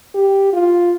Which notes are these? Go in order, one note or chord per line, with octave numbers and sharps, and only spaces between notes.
G4
F4